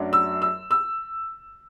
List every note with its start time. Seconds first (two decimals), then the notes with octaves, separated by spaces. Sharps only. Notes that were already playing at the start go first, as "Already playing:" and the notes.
Already playing: F#2 F#3 A3 D4
0.13 E6
0.42 E6
0.71 E6